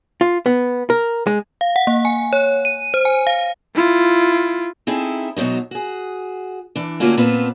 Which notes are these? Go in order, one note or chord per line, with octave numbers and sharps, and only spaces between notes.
F4
B3
A#4
G#3
F5
F#5
A#3
G#5
C#5
D#7
C5
G#5
F5
E4 F4
C4 D#4 E4 G#4 A4
G#2 B2 D3 F#3 D#4
F#4 G#4
E3 D4
D3 A3 A#3 C#4 F4 F#4
A#2 B3 C4 F4 B4 A5